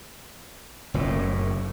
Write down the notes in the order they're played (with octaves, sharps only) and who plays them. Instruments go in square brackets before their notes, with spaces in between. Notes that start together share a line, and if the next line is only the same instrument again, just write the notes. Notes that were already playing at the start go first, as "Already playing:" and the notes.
[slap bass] F#1 A2